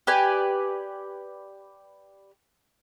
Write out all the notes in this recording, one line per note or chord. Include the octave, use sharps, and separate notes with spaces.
G4 B4 D5 G#5